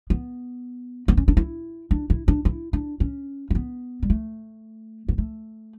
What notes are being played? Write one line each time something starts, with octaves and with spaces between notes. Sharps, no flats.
B3
B3
C#4
D4
E4
D4
E4
D4
E4
D4
C#4
C#4
B3
G3
A3
B3
A3